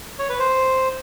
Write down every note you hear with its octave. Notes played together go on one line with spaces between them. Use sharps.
C#5
B4
C5